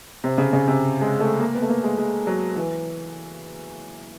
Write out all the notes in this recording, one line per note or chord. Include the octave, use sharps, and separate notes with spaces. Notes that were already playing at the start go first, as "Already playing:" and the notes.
C3
C#3
C#3
C3
G#3
A3
A#3
B3
A3
A#3
G#3
G#3
F#3
E3